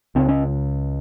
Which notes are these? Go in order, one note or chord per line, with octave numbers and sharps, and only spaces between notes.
C#2 C#3 C4
C#4